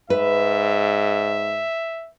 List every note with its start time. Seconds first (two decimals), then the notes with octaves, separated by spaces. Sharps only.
0.10 G#2 B4 E5